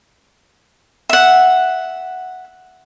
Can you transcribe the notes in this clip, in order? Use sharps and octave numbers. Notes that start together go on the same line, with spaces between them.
E5 F#5